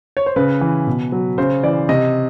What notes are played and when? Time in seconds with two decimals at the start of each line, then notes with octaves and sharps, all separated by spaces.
0.17 C#5
0.26 C5
0.36 C#3 B4
0.61 E3
0.87 B2
1.12 F#3
1.38 C#3 C5
1.63 E3 D5
1.89 C3 D#5